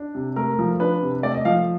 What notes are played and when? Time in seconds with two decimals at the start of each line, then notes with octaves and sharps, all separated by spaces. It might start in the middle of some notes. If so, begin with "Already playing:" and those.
Already playing: D4
0.15 C3
0.36 A3 A#4
0.59 F3
0.80 D4 B4
1.02 C3
1.23 A3 D5
1.34 D#5
1.45 F3 F5